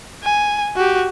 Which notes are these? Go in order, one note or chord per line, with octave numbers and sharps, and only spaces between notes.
G#5
F#4 G4